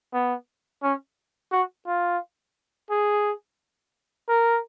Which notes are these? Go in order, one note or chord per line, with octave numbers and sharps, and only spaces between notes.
B3
C#4
F#4
F4
G#4
A#4